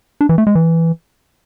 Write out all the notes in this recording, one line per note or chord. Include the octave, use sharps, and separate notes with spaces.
D4
E3
A3
G#3
E3